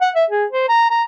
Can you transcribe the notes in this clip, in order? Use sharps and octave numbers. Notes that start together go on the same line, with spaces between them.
F#5
E5
G#4
C5
A#5
A#5